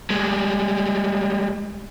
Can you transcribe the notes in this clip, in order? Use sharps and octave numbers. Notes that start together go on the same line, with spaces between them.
G3 G#3